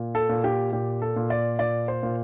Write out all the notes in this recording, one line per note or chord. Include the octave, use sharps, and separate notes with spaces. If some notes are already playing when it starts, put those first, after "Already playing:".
Already playing: A#2
A4
A#2
G4
A#2 G4
A4
A#2
D5
A#2 D5
C5
A#2